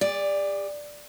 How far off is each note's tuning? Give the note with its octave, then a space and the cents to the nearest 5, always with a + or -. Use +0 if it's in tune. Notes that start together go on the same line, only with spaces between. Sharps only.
G#4 -45 D5 +0